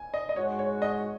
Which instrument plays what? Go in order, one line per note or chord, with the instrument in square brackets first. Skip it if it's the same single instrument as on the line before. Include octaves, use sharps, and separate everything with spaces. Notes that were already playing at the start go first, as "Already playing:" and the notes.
Already playing: [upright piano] G#5
D#5
D#5
[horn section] G#2 G#3 F#4 [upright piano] C#5
[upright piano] C#5
D#5